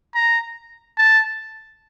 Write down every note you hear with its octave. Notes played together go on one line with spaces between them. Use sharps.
A#5
A5